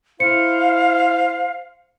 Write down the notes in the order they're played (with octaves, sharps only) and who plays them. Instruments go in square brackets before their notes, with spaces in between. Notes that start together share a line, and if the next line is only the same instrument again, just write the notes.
[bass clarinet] E4 [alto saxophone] C5 [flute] F5 [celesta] C#7